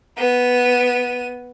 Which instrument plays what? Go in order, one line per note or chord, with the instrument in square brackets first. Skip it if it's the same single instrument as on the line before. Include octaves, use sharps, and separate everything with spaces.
[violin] B3 D#7